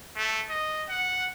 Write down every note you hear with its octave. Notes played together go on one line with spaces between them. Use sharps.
A3
D#5
F#5